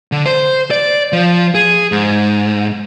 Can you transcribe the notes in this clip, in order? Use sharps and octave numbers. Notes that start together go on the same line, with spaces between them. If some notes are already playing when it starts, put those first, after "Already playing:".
D3
C5
D5
F3
G#4
G#2